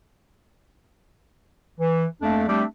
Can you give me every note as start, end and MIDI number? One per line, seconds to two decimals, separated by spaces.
1.80 2.05 52
2.22 2.45 41
2.22 2.45 57
2.22 2.45 58
2.22 2.45 62
2.48 2.64 55
2.48 2.64 57
2.48 2.64 60
2.48 2.64 62
2.48 2.64 67